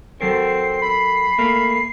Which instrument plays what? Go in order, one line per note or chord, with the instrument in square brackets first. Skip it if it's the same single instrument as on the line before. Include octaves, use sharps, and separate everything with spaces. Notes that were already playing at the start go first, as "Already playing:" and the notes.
[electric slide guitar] F#3 A4 A#4 [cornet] C4 [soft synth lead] C7
[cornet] B5
[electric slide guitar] A3 A#3 A#4